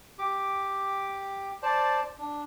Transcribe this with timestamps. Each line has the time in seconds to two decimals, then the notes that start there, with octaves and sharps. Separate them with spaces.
0.19 G4 D6
1.63 C5 D5 A5
2.19 D4